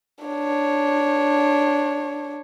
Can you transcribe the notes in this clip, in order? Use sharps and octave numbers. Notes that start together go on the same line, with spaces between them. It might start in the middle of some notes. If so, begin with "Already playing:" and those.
D4 C#5